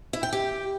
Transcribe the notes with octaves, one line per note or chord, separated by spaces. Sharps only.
E4
G5
G4